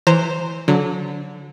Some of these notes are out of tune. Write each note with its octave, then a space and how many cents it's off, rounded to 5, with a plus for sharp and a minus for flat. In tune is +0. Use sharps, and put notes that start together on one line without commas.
E3 +0 C5 +0 A#5 -20
D3 -25 F#3 -20